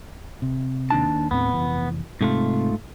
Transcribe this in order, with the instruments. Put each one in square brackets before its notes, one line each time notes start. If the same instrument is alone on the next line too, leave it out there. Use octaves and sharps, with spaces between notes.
[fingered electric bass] C3
[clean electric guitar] D#2 D4 A5
[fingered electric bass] D#2 A2 C4 [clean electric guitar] B3
[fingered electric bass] F1 A#1 E3
[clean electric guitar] G#2 A3 F4 [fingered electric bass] C3